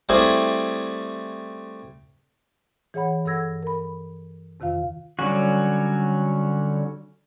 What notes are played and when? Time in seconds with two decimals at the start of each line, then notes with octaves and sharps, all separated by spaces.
0.09 G3 A3 C4 E4 G#4
2.94 E3 G#4 C#5 F#5 B5
3.25 G2 A4 F#5 E6 G#6 A#6
3.63 A#4 B5
4.60 F2 C3 D#3 F4 F5
5.19 D3 F#3 G3 C#4 F#4